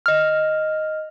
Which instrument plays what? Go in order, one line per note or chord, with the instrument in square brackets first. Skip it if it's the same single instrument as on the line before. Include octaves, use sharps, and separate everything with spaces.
[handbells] D#5 F6